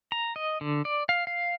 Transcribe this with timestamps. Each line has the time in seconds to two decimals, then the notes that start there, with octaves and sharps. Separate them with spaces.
0.12 A#5
0.36 D#5
0.61 D3
0.85 D5
1.09 F5
1.27 F5